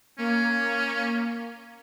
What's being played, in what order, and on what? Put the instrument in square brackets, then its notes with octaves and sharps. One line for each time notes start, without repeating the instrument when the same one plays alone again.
[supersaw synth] A#3 [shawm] C#4